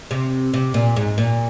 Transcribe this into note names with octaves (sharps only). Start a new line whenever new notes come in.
C3
C3
A#2
G#2
A#2